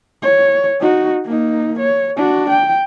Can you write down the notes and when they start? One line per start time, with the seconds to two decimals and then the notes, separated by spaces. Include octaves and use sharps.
0.22 C#5
0.80 D#4 F#4
1.25 A#3 D#4
1.79 C#5
2.17 D4 F#4
2.50 G5